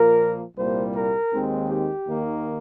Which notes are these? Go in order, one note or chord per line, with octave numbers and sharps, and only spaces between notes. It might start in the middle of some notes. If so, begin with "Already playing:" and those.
Already playing: A#2 F3 A#3 A#4
C2 A#2 G3 A#3 C5
A#4
D#2 D#3 G#3 C4
G4
D#2 D#3 A#3